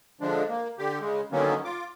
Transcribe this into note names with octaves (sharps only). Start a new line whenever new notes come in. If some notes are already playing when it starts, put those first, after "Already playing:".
D3 F3 G#3 D4
A#3
D3 G4
C#3 G#3
D3 D#3 F#3 A#3 B3 C#4
F4 D6